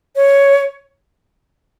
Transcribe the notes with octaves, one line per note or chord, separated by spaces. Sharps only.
C#5